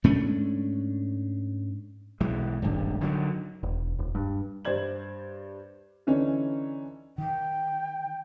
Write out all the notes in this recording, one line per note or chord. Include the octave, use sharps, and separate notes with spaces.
G#2 A3 C#4 D4
B1 E3 G#3
D#1 G#1 G2
D3 D#3 F3 F#3
E1
D#1
G2
G2 C5 D5 G#6 F#7
D3 E3 C#4 D#4
D#3 G5